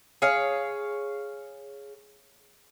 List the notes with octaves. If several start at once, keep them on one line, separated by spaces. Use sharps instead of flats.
G#4 C#5 F5